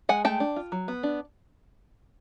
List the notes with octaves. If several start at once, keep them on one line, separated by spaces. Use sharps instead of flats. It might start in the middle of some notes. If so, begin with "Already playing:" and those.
G#3 F#5 G#5
A3 G5 A5
D4
F4
F#3
B3
D4